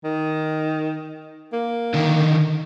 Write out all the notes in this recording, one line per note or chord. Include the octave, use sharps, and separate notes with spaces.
D#3
A#3
D3 D#3